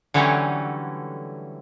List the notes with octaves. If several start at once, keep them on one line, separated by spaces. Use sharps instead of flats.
D3 E3 F#3 G3 A3 C#4